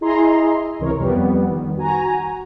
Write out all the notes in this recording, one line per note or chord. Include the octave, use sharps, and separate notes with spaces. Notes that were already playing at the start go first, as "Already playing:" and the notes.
E4 G#4 D#5 A#5 C6
C#2 C3 E3 A#4 C#5
F2 G3 B3
D#3
F#4 G#5 A#5